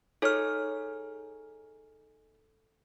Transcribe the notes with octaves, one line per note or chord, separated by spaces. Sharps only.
D#4 G#4 A4 C#5 F6